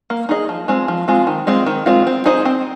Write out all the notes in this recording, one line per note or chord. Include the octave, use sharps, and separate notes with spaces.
A#3
D#4 G#4 D#5
F3
G#3 C4 F4
F3
G#3 C4 F4
D#3
G#3 C4 F4
D#3
G#3 C4 F4
C4
D#4 G#4 C5 D#5
C4